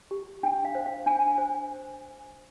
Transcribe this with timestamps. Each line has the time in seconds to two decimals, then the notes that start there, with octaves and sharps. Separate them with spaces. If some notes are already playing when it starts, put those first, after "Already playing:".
0.11 G4
0.43 D4 G5
0.65 F5
0.75 C5
0.86 F5
1.06 D4 G#5
1.38 C5